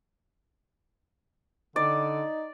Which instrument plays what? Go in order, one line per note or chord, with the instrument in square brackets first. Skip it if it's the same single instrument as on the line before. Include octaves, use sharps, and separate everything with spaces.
[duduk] D3 [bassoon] D#4 [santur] D5